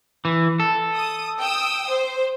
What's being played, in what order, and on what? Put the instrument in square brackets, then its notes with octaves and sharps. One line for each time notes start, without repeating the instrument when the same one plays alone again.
[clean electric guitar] E3
A4
[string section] D#6
G5 D#6 E6
C5